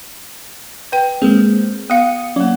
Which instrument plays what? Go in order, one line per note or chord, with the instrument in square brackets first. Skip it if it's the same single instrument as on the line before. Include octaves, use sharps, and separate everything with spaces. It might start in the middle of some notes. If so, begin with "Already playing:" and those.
[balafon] B4 G5
[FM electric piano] G#3 A#3 C4 [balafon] G#4
[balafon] B3 F5 [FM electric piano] D#6 C#7
[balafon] F#3 A#3 [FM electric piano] C#4